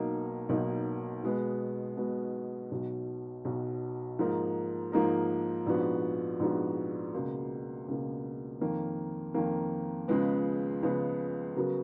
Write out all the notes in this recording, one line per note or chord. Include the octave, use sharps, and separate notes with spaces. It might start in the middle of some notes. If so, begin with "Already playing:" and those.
Already playing: B1 B2 A#3 D#4
B1 B2 A#3 D#4
B2 G#3 B3
B2 G#3 B3
B1 B2 F#3
B1 B2 F#3
G#2 F3 A#3 D#4 A#4
G#2 F3 A#3 D#4 A#4
A#1 G#2 F3 B3 F#4
A#1 G#2 F3 B3 F#4
C#2 B2 A#3
C#2 B2 A#3
F2 D#3 A#3
F2 D#3 A#3
C#2 C#3 F3 G#3 B3
C#2 C#3 F3 G#3 B3
C#3 F#3 B3 F#4 A#4